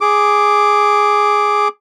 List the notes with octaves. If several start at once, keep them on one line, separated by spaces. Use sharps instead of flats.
G#4 D6